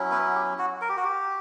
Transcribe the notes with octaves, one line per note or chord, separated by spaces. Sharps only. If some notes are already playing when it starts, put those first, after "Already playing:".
Already playing: F#3 C#4 E4
B3 B4
G4
F#4
A#4
G4
F#4
G4